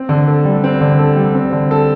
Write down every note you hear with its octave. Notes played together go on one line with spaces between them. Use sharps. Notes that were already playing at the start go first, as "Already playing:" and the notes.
Already playing: C4
D3
A4
G3
C4
D3
A4
G3
C4
D3
A4